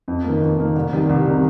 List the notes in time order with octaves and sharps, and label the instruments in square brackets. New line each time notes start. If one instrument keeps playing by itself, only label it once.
[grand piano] F2
D#3 A#3
F2
D#3 A#3
C2
C3 D#3 G3
C2
C3 D#3 G3